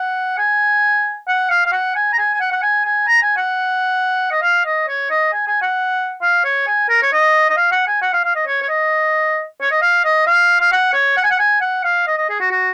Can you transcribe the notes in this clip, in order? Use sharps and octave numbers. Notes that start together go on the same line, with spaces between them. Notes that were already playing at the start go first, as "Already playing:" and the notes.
Already playing: F#5
G#5
F#5
F5
F5
F#5
G#5
A#5
G#5
G#5
F#5
F#5
G#5
G#5
A#5
G#5
F#5
D#5
F5
D#5
C#5
D#5
G#5
G#5
F#5
F5
C#5
G#5
A#4
C#5
D#5
D#5
F5
F#5
G#5
F#5
F5
F5
D#5
C#5
C#5
D#5
C#5
D#5
F5
D#5
F5
F5
F#5
C#5
F#5
G#5
F#5
G#5
F#5
F5
D#5
D#5
G#4
F#4
F#4